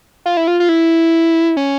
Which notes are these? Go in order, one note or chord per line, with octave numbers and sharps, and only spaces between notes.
F4
E4
F4
F4
E4
C#4